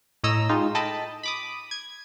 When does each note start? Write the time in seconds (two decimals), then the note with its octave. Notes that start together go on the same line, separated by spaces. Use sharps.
0.24 A2 C#5 D#5 A#5 E6
0.49 G#3 D#4 F4 G4
0.75 A4 D#5 G5 A5 B5
1.23 B5 D6 D#6
1.71 G#6